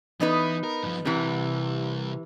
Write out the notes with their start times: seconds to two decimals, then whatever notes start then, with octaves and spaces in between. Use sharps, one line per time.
0.20 E3 B3 D#4 B4
0.64 A#4
0.83 G2 F3
1.05 C2 C3 E3